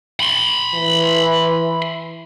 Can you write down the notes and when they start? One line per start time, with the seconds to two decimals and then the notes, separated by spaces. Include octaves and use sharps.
0.20 B5 C6
0.74 E3